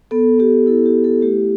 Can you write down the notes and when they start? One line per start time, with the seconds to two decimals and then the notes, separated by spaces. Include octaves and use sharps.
0.11 B3 A4
0.39 B3 G4
0.66 E4 A4
0.86 G4
0.95 E4
1.04 A4
1.22 A3 G4